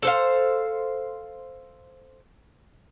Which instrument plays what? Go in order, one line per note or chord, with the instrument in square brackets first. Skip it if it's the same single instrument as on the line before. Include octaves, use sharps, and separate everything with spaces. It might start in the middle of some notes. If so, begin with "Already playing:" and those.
[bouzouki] A4 C5 F5